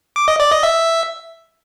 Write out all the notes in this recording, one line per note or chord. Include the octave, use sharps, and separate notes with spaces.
D6
D#5
D5
D#5
E5